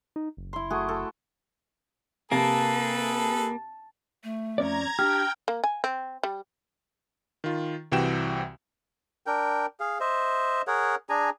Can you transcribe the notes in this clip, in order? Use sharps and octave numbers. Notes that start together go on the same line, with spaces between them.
D#4
F#1
E4 C6
A3 F#4 G#4
A4
C3 A#3 G#4 A4 B4 A5
A3
F2 C#4 D5 A#5 G#6
D4 G4 G5 F6
A#3
G#5
C4
G3
D#3 F4
C2 C3 E3 F#4 G5 E7
D4 A#4 G5
G#4 F5
C5 D#5 E5
G#4 A#4 C#5 F#5
D4 G#4 G#5 A#5